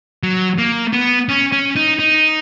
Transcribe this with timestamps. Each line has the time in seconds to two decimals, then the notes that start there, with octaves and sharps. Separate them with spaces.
0.23 F#3
0.58 A#3
0.93 B3
1.29 C#4
1.52 C#4
1.76 D#4
1.99 D#4